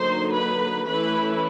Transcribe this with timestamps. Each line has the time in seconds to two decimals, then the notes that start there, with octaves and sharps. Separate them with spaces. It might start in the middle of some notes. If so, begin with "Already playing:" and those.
Already playing: D3 F#3 A#3 D#4 C5 C6
0.34 B4 B5
0.87 E3 A3 C#4 E4 B4 B5